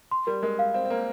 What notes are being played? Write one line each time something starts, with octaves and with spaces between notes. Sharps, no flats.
C6
G3 A#4
G#3 A#4
F5
C4 F5
C4
A#3 A#4